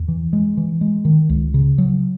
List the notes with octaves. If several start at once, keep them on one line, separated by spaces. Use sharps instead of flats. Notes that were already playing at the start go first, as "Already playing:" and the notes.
Already playing: E2
E3
G#3
E3
G#3
D#3
C#2
C#3
F#3